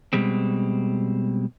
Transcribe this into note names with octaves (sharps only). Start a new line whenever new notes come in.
B2 G3 G#3 C4